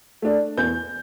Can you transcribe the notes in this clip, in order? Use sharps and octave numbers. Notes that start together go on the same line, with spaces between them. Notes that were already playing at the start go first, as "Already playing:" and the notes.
A3 D4
E2 G6